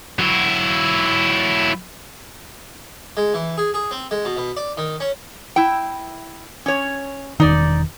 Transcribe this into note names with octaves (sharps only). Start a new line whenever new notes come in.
F#3 E4
G#3
E3
G#4
G#4
C4
G#3
B2
B2
D5
D#3
C#4
E4 G5
C#4 C#5
E1 D#3 D#4 D5